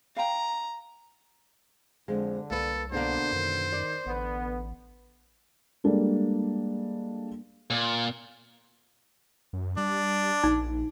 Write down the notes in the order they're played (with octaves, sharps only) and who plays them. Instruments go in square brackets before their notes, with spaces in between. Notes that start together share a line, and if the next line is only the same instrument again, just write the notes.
[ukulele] F5 G5 [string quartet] A#5
[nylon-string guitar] F2 G#3 [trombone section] D3
[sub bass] C2 [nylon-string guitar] A#3 B4 [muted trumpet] A4
[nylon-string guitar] B2 D3 A#3 [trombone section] B3 D4 [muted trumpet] C5
[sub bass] F#2 [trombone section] D#3
[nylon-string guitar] D5
[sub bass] A1 [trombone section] D3 B3
[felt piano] G3 G#3 A#3 D4 A4
[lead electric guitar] A#2
[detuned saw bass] F#2
[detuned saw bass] G3 [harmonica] D4
[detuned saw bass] A#1 [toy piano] D#4